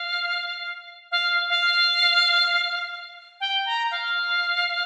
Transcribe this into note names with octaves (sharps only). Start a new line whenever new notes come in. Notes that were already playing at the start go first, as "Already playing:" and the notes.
Already playing: F5
F5
F5
G5
A#5
F5